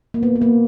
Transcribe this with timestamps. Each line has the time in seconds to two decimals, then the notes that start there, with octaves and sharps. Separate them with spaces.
0.14 A#3
0.23 B3
0.36 B3
0.42 A#3